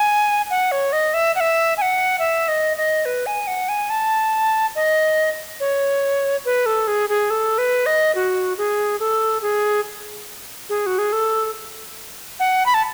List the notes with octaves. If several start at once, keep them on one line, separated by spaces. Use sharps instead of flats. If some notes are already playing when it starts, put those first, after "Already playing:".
Already playing: G#5
F#5
C#5
D#5
E5
F#5
E5
G#5
F#5
E5
D#5
D#5
B4
G#5
F#5
G#5
A5
D#5
C#5
B4
A4
G#4
G#4
A4
B4
D#5
F#4
G#4
A4
G#4
G#4
F#4
G#4
A4
F#5
B5
A5